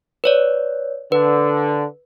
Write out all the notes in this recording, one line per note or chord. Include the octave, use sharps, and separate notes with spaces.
B4 C#5 D5
D3 B4